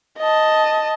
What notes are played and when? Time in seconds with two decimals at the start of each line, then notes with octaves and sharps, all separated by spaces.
0.19 D#5 A5